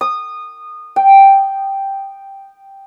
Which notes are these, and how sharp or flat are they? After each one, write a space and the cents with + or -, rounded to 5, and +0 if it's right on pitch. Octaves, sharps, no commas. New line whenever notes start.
D#6 -20
G5 +0